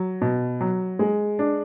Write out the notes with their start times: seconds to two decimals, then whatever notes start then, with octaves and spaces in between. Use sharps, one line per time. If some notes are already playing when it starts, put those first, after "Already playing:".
Already playing: F#3
0.22 B2
0.61 F#3
0.99 G#3
1.39 D4